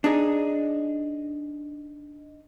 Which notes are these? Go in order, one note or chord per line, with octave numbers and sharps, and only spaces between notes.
D4 D#4 G#4